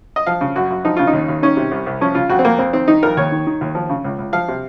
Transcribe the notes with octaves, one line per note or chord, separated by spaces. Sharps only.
D#5
F3 F5
C#3
F#2 F#4
F#2
F3 D#4
C#3 F4
D#4
D#2
D#2
D#3 C#4
C3
C2
C2
F3 C#4
C#3 F4
F2 F#4
C4
F2 A#3
F2 C4
D#3 C4
D#3 D#4
F2 A#4
D#2 C#5
D#3
D#3
D#2
F3
C#3
C#2
C#2
F3 F5
C3